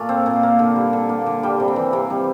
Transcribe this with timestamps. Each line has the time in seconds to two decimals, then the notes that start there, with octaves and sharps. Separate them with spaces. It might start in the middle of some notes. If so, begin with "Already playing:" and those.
Already playing: A#2 A3 D5 F5
0.09 C4
0.26 A#2
0.43 A#3
0.59 D3
0.76 G3
0.93 D3
1.09 A#3
1.26 D3
1.43 G3 G5
1.60 C3
1.68 G5
1.76 E3
1.93 C3 G5
2.10 G3